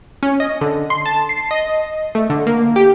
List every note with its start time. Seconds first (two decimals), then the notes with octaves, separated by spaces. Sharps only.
0.23 C#4
0.40 D#5
0.61 D3
0.90 C6
1.06 A5
1.29 C7
1.51 D#5
2.15 A3
2.30 D3
2.47 A#3
2.76 G4